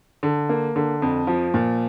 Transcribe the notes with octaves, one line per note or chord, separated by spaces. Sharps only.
D3
A#3
D3
F2
F3
A#2